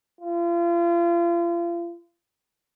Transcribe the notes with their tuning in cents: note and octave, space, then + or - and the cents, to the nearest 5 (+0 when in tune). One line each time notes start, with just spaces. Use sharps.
F4 -35